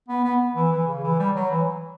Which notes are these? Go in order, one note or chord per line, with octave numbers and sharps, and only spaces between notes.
B3
B3
E3
E3
C#3
E3
G3
F#3
E3